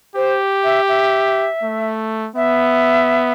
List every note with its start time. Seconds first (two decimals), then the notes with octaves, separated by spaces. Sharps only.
0.16 G4 C5
0.64 E5
0.88 E5
1.63 A3
2.36 B3 E5